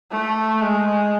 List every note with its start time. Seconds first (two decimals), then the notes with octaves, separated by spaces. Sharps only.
0.12 A3
0.62 G#3